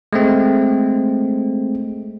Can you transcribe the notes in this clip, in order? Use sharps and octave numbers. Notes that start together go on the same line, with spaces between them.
G#3 A3 C4